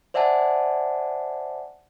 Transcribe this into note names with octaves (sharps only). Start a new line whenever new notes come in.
C5 D5 E5 F#5 G#5 A5